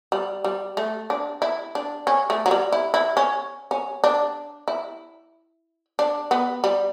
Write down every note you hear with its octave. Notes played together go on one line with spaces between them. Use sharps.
G3
G3
A3
D4
E4
D4
C#4
A3
F#3
G3
E4
E4
C#4
C#4
D4
E4
D4
B3
G3